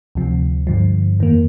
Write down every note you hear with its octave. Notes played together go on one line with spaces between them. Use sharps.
D2 C3 F3
G2 D3 F3
F2 D#3 A#3